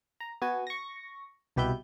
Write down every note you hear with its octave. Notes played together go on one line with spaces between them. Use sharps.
A#5
B3 F#4 G#5
C#6 A#6
C2 B2 G4 B4 E5 G6